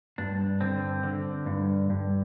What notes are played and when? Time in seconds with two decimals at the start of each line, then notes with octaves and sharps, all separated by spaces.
0.18 G2 D4
0.61 D3 C4
1.03 D3
1.46 G2
1.90 G2